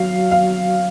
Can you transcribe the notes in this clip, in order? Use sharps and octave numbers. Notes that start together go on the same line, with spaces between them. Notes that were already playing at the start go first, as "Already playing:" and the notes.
Already playing: F#3 F5
F5